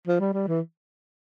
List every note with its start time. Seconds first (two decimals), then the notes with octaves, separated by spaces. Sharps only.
0.08 F3
0.20 G3
0.34 G3
0.48 E3